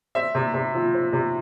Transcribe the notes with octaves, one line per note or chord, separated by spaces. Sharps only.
C4 E5
C3
C3
F3
C4
C3